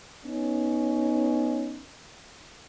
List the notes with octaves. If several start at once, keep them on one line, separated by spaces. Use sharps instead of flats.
B3 C#4 D#4